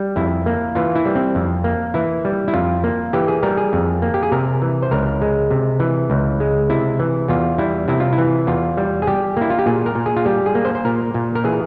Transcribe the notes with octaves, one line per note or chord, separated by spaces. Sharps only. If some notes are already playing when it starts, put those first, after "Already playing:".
Already playing: G3
F2 E4
A#3
E3 F4
E4
G3
C4
F2
A#3
E3 E4
G3
E4
F2 F4
A#3
E3 G4
G#4
G3 A#4
G#4
F2
A#3
G4
G#4
C3 A#4
E3
C5
C#2 A#4
G#3
C3
E3
C#2
G#3
C3 E4
E3
E2 F4
G3 E4
C3 E4
F4
E4
E3
E2 F4
G3
G#4
G3 G4
A#3 E4
F4
G4
A#2 G#4
A#4
A#2
G#4
F4
G3 G4
G#4
A#3
C5
C5
A#2 A#4
A#2
A#4
E3 G#4